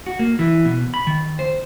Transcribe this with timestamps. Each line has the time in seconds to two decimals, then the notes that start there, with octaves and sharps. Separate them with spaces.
0.06 F#4
0.19 A#3
0.39 E3
0.65 B2
0.94 B5
1.07 D#3
1.39 C5